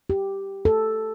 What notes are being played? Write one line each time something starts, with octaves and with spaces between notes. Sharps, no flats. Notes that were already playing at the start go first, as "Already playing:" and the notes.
G4
A4